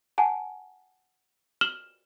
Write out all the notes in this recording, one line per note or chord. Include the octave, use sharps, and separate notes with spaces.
F#5 G#5 A5
F6 E7 F#7 G7